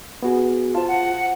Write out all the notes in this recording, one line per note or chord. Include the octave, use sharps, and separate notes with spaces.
B3 F#4 G#4
F4 C5 A5
F#5